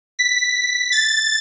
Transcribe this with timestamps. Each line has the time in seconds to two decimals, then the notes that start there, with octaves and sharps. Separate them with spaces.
0.19 B6
0.92 A6